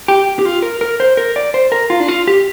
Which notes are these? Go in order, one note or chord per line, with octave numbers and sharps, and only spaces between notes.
G4
G4
F4
A#4
A#4
C5
A#4
D5
C5
A#4
F4
D4
F4
G4